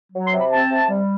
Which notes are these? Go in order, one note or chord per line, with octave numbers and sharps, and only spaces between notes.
F#3
C6
C3
B5
C4 A5
C3
G3